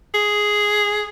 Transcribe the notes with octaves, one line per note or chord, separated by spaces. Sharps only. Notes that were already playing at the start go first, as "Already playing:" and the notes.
G#4